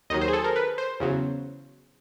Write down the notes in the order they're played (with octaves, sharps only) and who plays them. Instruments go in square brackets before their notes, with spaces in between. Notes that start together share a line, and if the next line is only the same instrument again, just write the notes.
[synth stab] D#2 D#3 F#3 D#5
C5
G#4
A4
A#4
B4
C5
E2 C#3 F#3